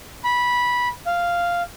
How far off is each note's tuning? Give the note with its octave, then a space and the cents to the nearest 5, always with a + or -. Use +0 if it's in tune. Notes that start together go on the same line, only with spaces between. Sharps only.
B5 -15
F5 -5